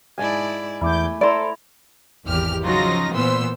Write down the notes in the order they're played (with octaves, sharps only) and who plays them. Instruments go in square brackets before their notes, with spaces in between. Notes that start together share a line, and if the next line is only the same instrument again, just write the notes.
[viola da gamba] G#2 E4 D5 [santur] G#5 A5
[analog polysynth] E2 D6 G6 [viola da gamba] A3 [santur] E4
[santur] E4 A#5 [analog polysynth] A4 [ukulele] C5 D5
[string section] G#1 E2 G4 F6
C#3 F3 F#3 D#4 F4 A#6
A#2 E3 B3 C5 C6 E6